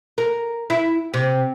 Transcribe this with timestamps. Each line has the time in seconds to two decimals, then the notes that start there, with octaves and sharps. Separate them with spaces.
0.18 A#4
0.70 E4
1.14 C3